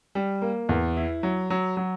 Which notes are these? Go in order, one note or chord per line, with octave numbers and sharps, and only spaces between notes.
G3
A#3
E2
E4
F#3
F#3
F#3